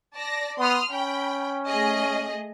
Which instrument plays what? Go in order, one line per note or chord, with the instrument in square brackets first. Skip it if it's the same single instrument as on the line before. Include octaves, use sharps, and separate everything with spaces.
[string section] D5 A5 A#6
[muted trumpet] B3 [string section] C6 D#6 F6
[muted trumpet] C#4 [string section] G5 B5
[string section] A3 G#4 D#5